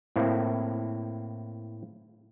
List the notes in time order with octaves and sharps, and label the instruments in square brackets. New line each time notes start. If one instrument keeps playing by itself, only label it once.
[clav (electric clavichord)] A2 A#3 C4 E4